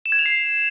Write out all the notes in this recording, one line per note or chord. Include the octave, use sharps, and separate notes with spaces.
E7
G#6
F7
C7